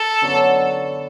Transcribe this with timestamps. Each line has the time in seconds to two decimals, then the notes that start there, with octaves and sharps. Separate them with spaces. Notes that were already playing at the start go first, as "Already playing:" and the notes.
Already playing: A4
0.21 F#2 D3 F#3 B3